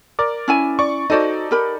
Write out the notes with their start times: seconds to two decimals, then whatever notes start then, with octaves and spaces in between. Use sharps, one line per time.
0.19 A#4 D5 D6
0.48 C#4 E4 G#5
0.79 D5 C#6
1.10 D#4 F#4 A4 C5 D5 D#5
1.51 G4 A#4 B5